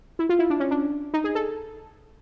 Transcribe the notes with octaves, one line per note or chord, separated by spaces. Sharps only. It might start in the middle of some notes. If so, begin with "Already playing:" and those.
E4
F4
E4
D4
C#4
D4
D#4
G#4
A4